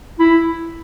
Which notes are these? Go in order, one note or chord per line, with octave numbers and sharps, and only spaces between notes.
E4